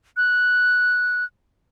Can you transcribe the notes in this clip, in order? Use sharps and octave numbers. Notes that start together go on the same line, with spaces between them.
F#6